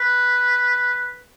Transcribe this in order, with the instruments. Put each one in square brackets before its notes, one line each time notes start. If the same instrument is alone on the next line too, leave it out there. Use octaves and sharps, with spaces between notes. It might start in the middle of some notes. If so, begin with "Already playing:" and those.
Already playing: [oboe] B4